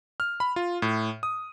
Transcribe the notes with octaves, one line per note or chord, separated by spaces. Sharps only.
F6
B5
F4
A2
D#6